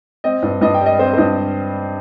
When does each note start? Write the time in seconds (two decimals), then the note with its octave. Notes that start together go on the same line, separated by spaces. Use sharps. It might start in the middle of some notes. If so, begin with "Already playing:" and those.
0.24 C4 D#5
0.43 G2
0.61 G2 D#5
0.74 G5
0.80 G3
0.86 D#5
0.99 C4 C5
1.13 C5
1.18 G2 D#5